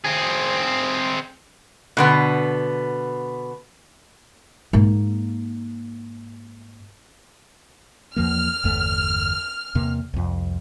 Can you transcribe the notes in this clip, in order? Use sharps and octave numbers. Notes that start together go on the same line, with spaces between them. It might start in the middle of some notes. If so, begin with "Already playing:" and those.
C4 G#4
B2 D3 B3
G#2 A#3
E2 F3 A#3 F6
G1 E2 A3
E2 C3 A#3
C2 F2